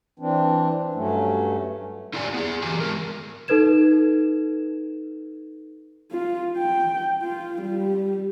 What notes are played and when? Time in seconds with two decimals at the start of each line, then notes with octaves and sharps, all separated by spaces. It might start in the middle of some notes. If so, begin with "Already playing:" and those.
0.19 E3 C4 D4
0.94 G2 F#3 A3 C#4
2.13 E4 F4 G4 D5 G#5
2.34 B3 G#4
2.63 E3 F#4 G4 G#5
2.80 G#3 G#4 A#4
3.48 D#4 A4 B4 G#6 E7
6.12 F4
6.57 G5
7.23 F4
7.61 G3